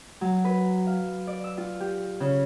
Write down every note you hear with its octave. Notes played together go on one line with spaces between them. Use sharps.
F#3
B4
F5
D5
E6
F4
G4
C#3